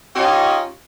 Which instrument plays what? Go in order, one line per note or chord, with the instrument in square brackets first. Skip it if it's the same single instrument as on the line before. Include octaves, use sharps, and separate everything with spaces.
[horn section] C#4 D#4 F4 G4 C#5 D#5